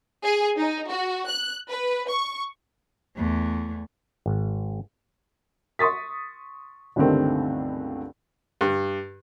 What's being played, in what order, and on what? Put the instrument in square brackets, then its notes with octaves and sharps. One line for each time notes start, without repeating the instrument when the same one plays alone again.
[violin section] G#4
D#4
F#4
F#6
B4
C#6
[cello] E2 A3
[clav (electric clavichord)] G#1
[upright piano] C6 C#6 D#6 A6 B6
C#2 G2 D3 D#3 A3 C4
[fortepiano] G2